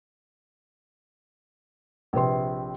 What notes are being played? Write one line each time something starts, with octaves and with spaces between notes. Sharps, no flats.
A#1 C3 B4 C6